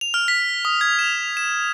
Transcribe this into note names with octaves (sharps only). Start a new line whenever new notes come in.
F7
F6
B6
D#6
G#6
E7
E7